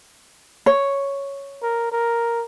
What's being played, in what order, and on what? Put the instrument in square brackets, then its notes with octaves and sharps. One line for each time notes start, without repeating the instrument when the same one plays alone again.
[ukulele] C#5
[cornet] A#4
A#4